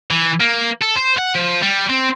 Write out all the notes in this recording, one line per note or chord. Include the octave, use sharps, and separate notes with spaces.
E3
A#3
A4
C5
F#5
F3
G3
C4